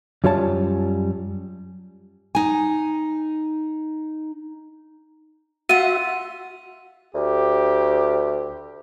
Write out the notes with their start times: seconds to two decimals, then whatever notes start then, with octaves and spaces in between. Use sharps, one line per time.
0.24 F#2 G3 F4 C#5 A5
2.35 D#4 G#5
5.69 F4 F#4 E5 F#5 D#7
7.14 D2 G4